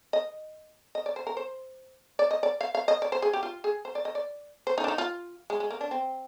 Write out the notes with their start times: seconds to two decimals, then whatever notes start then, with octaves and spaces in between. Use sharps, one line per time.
0.13 D#5
0.95 D#5
1.06 D5
1.16 C5
1.27 A#4
1.37 C5
2.19 D5
2.31 D#5
2.43 D5
2.61 F5
2.75 F5
2.88 D#5
3.02 D5
3.12 C5
3.22 G#4
3.33 G4
3.43 F4
3.64 G#4
3.85 C5
3.95 D5
4.05 D#5
4.15 D5
4.67 C5
4.78 D#4
4.84 D4
4.88 D#4
4.98 F4
5.50 G#3
5.60 G#3
5.71 A#3
5.81 D4
5.91 C4